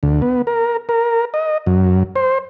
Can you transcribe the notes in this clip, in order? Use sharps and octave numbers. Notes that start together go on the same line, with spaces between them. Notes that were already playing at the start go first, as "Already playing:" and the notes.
D2
B3
A#4
A#4
D#5
F#2
C5